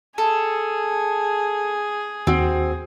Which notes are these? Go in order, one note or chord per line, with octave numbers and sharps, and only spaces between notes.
G#4 A4
D#2 C4 F#4